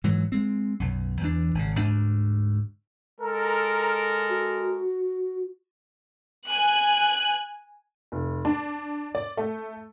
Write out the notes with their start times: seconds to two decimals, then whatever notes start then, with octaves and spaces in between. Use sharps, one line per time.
0.04 G#2 E3 F#3
0.32 G#3 C4
0.80 B1 F#2
1.21 E2 E3 G3 D4
1.55 G#1 C#3
1.78 D2 G#2 B3 D4
3.21 G#3 A4 A#4
4.30 F#4
6.48 G#5 F#6
8.12 F1
8.45 D4
9.15 D5
9.37 A3